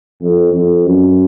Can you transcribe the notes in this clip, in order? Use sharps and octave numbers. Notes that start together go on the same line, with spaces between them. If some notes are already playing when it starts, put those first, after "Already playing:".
F2
F2
F#2